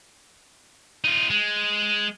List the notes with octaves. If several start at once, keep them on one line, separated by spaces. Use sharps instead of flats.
D#4 F4
G#3